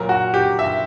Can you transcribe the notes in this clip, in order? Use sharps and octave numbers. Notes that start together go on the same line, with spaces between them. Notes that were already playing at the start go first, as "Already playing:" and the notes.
Already playing: A#2 F#3 A#4
F#4
G4
E5